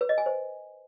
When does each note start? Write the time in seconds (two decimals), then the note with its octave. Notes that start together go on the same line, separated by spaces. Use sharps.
0.01 B4
0.09 D#5
0.18 G#5
0.26 C5